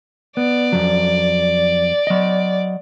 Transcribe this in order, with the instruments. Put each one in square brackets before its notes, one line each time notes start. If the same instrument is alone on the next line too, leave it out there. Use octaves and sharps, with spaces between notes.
[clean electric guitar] B3 [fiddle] D5
[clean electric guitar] F2 F#3
F#3 D#5